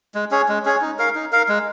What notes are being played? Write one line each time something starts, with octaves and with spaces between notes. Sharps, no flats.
G#3
C#4 G#4 C#5
G#3
C#4 G#4 C#5
D#4
A#4 F5
D#4
A#4 F5
G#3